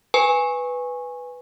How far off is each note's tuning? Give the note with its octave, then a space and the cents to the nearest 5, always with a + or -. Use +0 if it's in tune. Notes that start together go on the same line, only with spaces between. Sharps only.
B4 +0 G#5 -10 C#6 -15